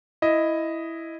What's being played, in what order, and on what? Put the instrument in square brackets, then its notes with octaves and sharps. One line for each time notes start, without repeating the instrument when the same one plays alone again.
[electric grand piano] E4 D#5